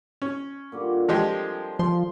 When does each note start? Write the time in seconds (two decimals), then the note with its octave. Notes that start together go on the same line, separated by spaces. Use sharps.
0.22 C#4
0.72 A#2 D3 G3
1.08 F3 G#3 C4 G4 A#4
1.79 F3 C6